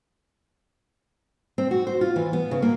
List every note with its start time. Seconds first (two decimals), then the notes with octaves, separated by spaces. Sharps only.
1.58 C4
1.71 F#4
1.87 C5
2.01 F4
2.16 E3
2.33 B3
2.51 C#3
2.62 A#3